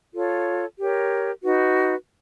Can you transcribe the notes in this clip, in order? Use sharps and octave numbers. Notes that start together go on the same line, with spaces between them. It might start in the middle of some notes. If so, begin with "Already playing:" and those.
F4 A4 C#5
G4 A#4 C#5
D#4 F#4 B4